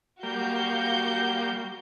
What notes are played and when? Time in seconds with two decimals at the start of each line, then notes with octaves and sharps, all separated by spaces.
0.23 G3 A#3 F#4 F5 G6